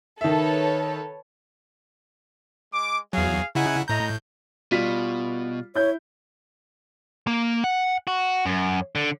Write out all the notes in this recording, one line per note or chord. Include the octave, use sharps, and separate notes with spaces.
D#3 A4 B4 C#5 E5
G#3 D6
E2 F#3 G#4 F5
C#3 D#4 E4 F#5 G#5
A2 D#5 A#5 G6
B2 G3 F4 B6
E4 C#5 G6
A#3
F#5
F#4
F#2
D3